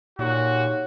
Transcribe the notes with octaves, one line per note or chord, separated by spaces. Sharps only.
A#2 D#4 F#4 G4 C#5